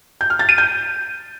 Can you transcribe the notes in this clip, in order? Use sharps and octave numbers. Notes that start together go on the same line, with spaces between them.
G6
F6
A6
D#7
G6